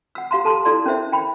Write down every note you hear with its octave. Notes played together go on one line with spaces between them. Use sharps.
F#5 E6
G4 F5 A#5 C6
A4 A5 A#5 C6
E4 A4 D5 C6
C#4 A#4 C5 E5
G5 B5